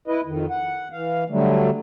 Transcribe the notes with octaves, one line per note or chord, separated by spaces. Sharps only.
E4 B4 D#5
F2 D#3
F#5
E3 F5
D3 F#3 G3 A3